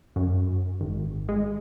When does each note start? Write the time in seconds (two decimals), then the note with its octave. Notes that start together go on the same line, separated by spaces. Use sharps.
0.16 F#2
0.81 G#1
1.29 G#3